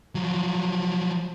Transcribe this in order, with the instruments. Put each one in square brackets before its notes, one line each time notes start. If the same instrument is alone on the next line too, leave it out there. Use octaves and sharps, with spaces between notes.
[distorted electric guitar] F3 F#3